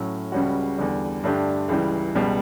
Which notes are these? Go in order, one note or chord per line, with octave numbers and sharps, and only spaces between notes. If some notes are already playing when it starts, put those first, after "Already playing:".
Already playing: A2 F#3 C#4
C#2 C#3 G3 C#4 F#4
E2 D3 G3
G2 D3 A3 D4 G4
C#2 C#3 E3 G3
C#2 B2 G3